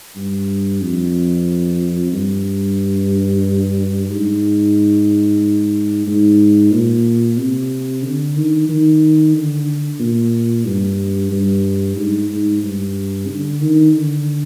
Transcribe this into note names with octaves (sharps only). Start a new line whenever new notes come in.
G2
F2
G2
G#2
G#2
A#2
C3
D3
D#3
D#3
D3
A#2
G2
G2
G#2
G#2
G2
D3
D#3
D3